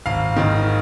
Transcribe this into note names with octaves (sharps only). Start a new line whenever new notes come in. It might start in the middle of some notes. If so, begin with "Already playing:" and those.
G#1 F5
G#2 D#3